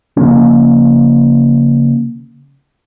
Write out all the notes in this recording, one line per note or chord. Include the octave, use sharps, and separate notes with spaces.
C#3 F3 A#3 C#4